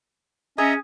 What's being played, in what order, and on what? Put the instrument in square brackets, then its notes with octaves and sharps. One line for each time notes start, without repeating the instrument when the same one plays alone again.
[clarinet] C#4 [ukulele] G#4 [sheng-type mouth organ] D#5 E5 A#5